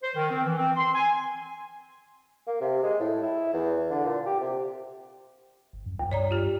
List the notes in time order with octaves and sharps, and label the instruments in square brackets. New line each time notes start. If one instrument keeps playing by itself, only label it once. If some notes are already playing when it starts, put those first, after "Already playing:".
[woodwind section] C5
D#3
C4
E3
C4
C6
G#5
[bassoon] A#3
C3
G#3
A2
E4
E2
D3
A#2
G4
C3
[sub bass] G1
F#2
[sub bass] C#2 [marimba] G2
[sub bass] G2 [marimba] C#5 D5 A#5
[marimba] F4 G4